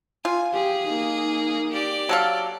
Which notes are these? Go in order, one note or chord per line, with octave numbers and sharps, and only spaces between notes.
F4 G#5
G4 G#4
A#3 D#4
G4 D5
F#3 A4 F5